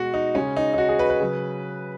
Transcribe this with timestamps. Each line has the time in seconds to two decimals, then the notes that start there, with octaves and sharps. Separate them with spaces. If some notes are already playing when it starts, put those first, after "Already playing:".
Already playing: B2 G#3 F#4
0.14 D#4
0.35 C#3 G#3 C#4
0.57 D#4
0.74 D#4
0.78 F#4
0.89 G#4
0.99 B4
1.10 B4
1.20 C#3 F#3